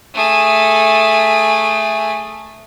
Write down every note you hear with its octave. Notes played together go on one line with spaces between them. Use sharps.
A3 G#4